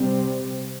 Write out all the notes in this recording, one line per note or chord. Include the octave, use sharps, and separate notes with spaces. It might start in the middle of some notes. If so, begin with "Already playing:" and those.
Already playing: C3 G3 C4